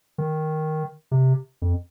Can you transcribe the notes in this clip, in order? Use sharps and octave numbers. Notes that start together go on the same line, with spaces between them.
D#3
C3
F2